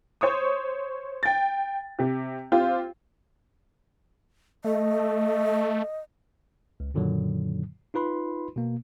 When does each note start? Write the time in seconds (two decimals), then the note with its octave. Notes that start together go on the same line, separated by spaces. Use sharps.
0.21 C5 C#5 C#6 D#6
1.23 G5 A6
1.99 C3 G4
2.52 C4 F4 G4 C5
4.64 A3 D#5
6.80 C#2
6.94 F#2 A#2 D3 D#3 F#3
7.94 D#4 F4 B4 B5 C6
8.56 B2 A#3